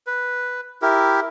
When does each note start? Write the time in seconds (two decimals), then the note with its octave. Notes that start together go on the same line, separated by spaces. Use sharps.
0.07 B4
0.82 E4 G4 A#4